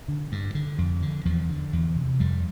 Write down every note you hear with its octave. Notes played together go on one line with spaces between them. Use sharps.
D3
G2
D3
F2
D3
E2 F3
D3
E2
C3
F2 G3